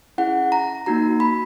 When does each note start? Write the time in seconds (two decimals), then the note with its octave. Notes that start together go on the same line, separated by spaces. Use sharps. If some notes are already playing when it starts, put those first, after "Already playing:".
0.18 C#4 E4 G#4 F#5
0.52 A#5
0.86 A#3 D#4 F#4 A#5
1.20 B5